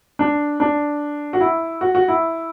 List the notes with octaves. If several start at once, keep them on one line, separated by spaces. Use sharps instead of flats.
D4
D4
F#4
E4
F#4
F#4
E4